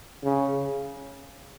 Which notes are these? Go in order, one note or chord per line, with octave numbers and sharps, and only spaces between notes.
C#3